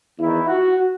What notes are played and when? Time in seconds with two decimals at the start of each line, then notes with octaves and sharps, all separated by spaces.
0.17 E2 D#3 E4
0.48 F#4